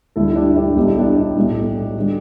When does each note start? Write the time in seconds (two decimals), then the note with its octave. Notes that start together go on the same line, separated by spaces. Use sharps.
0.16 D2 D3 G3 E4 A4
0.31 E4
0.36 D4 G4
0.56 D4 G4
0.76 B1 B2 G3 G4
0.88 E4
0.98 D4 G4
1.36 B1 A2 G3
1.98 D3 G3